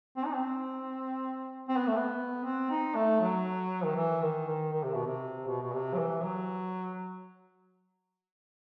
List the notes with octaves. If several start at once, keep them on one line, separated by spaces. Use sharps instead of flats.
C4
D#4
C4
C4
B3
A3
B3
C4
D#4
A3
F#3
D#3
E3
D#3
D#3
D#3
C3
B2
C3
B2
B2
C3
F#3
E3
F#3